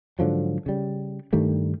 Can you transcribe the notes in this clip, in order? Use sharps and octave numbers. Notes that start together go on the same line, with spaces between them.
G#2 D3 F3 F#3
C#3 G3
G2 D#3 G3 A3